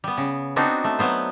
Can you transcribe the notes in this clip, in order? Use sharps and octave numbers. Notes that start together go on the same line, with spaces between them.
G3 B3
C#3
B3 C4 D4 D#4 F#4
A3
F#3 B3 C5